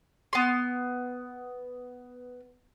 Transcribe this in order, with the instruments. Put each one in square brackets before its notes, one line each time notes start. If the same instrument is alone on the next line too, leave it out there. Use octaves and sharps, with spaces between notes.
[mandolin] B3 C6